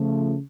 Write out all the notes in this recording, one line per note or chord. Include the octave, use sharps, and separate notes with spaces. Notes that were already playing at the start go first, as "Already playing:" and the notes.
Already playing: C#3 F3 A3